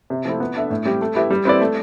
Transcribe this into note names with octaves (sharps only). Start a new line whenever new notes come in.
C3
F3 A3 C4 E4
B3
D4 A4 E5
A2
G3 C4 G4 C5
A3
E4 G4 B4 E5
G3
C4 E4 B4 D5
A3